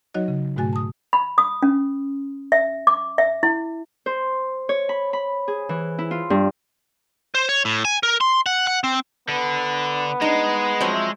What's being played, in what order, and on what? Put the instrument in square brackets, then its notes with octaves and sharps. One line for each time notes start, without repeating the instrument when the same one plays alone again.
[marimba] F#3 D#4 F#4 C#5 D#5
C#3
G#2 B2 A3 F#4 G#5 A6
A5 D#6
[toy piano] B5
D#6
C#4
E5
D6
E5
E4
[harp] C5
C#5
B5
B5
G#4
E3
E4
F4
G2
[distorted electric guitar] C5
C#5
A2
G#5
A#4
C6
F#5
F#5
C4
[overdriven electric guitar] D3 [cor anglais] B3
[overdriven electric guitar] G#3 [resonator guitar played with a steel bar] D#4
[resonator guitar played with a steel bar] F3 F#3 C4
[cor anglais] E5